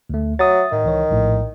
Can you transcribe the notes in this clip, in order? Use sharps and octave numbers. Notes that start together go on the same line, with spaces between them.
D2 A3
F#3 E5 D#6 A6
A2 D#3
C#2 E3 C#5
A#1 A2